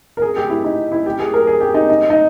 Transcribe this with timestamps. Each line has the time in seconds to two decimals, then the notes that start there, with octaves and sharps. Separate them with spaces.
0.17 A#4
0.22 G#4
0.36 G4
0.50 E4
0.64 D#4
0.92 E4
1.06 G4
1.20 G#4
1.34 A#4
1.47 G#4
1.61 G4
1.74 D#4
1.90 D#4
2.10 D#4